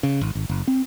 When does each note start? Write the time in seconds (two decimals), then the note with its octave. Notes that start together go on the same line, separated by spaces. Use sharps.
0.03 C#3
0.21 G#1
0.35 G#1
0.49 F#1
0.68 C4